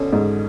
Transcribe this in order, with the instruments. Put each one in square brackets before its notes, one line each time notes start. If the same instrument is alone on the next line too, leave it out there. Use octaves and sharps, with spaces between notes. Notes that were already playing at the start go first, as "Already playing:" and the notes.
Already playing: [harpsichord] B2 D3 [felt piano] C#4
[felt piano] G#2